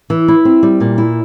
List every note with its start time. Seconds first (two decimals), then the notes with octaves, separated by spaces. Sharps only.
0.10 E3
0.28 E4
0.45 C4
0.63 G3
0.80 A#2
0.98 E4